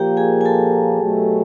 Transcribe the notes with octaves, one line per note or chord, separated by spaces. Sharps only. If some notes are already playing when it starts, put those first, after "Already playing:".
Already playing: A#2 F3 A#3 G4 G5
G#4 G#5
G#5
A4 A5
B2 F#3 A3